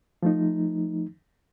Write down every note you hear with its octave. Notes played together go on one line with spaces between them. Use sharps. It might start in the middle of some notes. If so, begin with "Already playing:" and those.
F3 A3 D#4